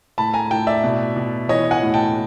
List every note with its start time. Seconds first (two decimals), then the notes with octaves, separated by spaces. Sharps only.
0.18 A2 A5 B5
0.34 G#5 A#5
0.51 A2 G5 A5
0.67 D5 E5
0.84 B2
1.16 B2
1.49 E3 C#5 D#5
1.71 F#5 G#5
1.82 A2
1.94 G5 A5